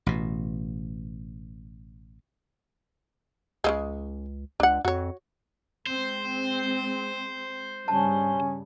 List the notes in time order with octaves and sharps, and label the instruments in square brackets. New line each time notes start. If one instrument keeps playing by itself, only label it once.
[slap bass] A1 B2
[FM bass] C#2 [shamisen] C#3 F3 G#3
[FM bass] C#2 [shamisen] D4 F#5
[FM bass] F2 [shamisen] F#4 C#5
[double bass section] G#3 C4 [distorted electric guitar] C5
[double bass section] G2 C#3 G3 [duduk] C#4 [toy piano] A5